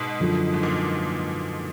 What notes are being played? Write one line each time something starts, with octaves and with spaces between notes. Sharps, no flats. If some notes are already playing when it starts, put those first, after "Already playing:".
Already playing: G#2 B2
F#2 D3 F3
G#2
A#2